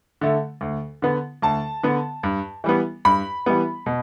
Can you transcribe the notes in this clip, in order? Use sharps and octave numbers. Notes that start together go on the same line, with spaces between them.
D3 A3
D2
D3 B3
D2 A5
D3 B3
G2
E3 G3 B3
G2 B5
E3 G3 B3
B2